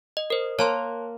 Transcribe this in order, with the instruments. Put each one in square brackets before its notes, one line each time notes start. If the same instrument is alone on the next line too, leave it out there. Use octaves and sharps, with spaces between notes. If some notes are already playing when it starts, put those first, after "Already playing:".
[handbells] D#5
A#4 C5
[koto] A#3 [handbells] C#5 A5 C6